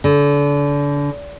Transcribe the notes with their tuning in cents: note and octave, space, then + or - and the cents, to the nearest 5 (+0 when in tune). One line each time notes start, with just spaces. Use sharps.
D3 -30